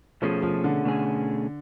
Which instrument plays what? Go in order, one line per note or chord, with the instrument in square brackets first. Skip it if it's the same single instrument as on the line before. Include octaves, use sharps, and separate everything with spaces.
[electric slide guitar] B2 A3 C#4 G#4 [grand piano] F3
[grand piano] F3
D3
[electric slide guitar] B2 A3 C#4 G#4